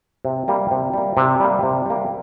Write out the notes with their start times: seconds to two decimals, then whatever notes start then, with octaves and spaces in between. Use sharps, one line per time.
0.25 C3
0.48 G3 A#3
0.71 C3
0.94 G3 A#3
1.17 C3
1.40 G3 A#3
1.63 C3
1.86 G3 A#3